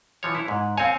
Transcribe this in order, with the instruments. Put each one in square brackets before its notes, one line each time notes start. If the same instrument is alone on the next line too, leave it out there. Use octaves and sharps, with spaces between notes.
[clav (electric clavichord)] E3 F3 C#5
E4 C#5
G#2
[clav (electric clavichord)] C4 C#5 [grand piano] F5 G#5